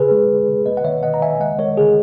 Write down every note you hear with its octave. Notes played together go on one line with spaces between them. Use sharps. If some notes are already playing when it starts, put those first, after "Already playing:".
Already playing: C#3 G#4 B4
G#3
C#3
C#3
A#3 B4 D#5
F#5
D#3 C#5 E5
D#3 D#5 F#5
A#5
D#3 E5 G#5
G#3 D#5 F#5
G#3 A#4 C#5
C#3 G#4